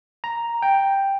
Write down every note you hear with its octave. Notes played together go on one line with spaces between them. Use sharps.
A#5
G5